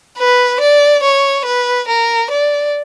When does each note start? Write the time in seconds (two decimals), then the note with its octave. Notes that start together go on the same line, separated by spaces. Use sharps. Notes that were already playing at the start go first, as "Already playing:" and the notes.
0.18 B4
0.60 D5
1.03 C#5
1.45 B4
1.88 A#4
2.30 D5